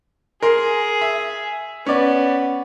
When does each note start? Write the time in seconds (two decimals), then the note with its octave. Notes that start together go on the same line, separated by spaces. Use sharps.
0.42 G#4 A#4 C6
1.01 E5
1.86 B3 C#4 D5